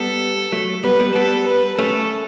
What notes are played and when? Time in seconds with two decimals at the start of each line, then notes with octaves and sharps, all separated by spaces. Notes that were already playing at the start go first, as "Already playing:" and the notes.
Already playing: G3 B3 A4
0.52 F#3 A3
0.84 G3 B3 B4
1.00 G3 B3
1.15 G3 B3 A4
1.47 B4
1.78 A3 C#4 A4